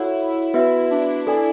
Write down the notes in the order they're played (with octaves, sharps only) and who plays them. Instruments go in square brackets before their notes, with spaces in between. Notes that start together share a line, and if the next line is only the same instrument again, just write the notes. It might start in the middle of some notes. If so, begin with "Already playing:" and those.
Already playing: [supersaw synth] E4 [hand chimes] F#4 A4 C#5 F#5
[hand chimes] B3 F#4 B4 E5
[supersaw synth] D4
[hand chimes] D4 A4 D5 G#5